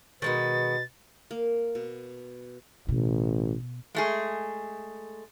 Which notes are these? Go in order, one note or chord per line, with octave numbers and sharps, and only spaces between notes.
B2 D#3 G#3 B3 B4 A6
A#3
B2
A1 B2
G#3 A3 G#4